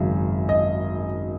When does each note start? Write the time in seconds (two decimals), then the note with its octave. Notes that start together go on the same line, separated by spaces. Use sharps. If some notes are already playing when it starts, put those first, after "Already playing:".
Already playing: G#1 F#2 C#3
0.49 D#5